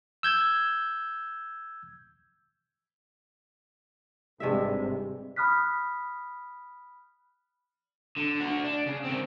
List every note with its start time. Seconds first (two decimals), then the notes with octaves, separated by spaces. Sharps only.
0.23 E6 G6 G#6
4.40 G#1 G2 C3 G#3 E5
5.36 B5 D#6 F6 F#6 B6
8.18 D3
8.41 D3 F#4
8.64 D4
8.86 C#3
9.04 D#3 C4